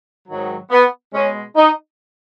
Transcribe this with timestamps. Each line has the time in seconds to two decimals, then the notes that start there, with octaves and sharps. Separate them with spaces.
0.28 G#2 D#3 F#3
0.71 B3
1.13 B2 G#3 C#4
1.56 D#4